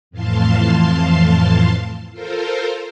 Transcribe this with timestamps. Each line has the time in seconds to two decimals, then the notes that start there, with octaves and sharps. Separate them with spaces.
0.11 F2 A2 E3 F5 A5 C6
2.11 F4 A4 A#4 C5